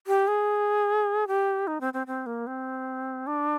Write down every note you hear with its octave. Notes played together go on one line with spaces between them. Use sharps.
G4
G#4
G4
D#4
C4
C4
C4
A#3
C4
D4